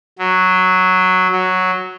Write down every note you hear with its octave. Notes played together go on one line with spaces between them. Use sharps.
F#3
F#3